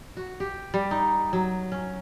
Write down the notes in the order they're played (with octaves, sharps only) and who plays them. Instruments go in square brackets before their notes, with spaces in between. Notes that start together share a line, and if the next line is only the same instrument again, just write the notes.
[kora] F#4
G4
G3
D#4
F#3
C#4